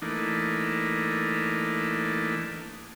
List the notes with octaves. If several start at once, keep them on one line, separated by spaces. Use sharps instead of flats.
E3 A3 A#3 D4 D#4